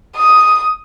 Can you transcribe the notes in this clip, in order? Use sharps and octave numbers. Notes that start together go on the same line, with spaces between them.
D#6